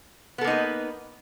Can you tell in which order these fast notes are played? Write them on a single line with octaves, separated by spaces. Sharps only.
B3 A4 A#3 D#4 B4